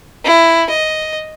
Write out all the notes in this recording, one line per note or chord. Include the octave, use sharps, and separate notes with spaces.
E4
D#5